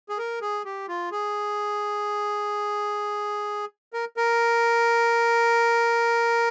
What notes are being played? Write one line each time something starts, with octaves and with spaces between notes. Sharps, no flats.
G#4
A#4
G#4
G4
F4
G#4
A#4
A#4